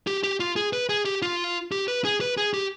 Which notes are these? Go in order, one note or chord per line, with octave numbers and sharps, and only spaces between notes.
G4
G4
F4
G#4
B4
G#4
G4
F4
G4
B4
G#4
B4
G#4
G4